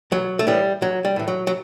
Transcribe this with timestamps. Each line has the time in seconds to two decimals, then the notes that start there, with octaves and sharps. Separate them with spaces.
0.12 B1 F#3
0.39 A3
0.47 A2 E3 G3
0.81 B1 F#3
1.05 G3
1.16 A2 E3
1.28 F#3
1.47 F#3